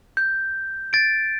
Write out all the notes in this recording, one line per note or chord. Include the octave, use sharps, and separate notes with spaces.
G6
A6 D7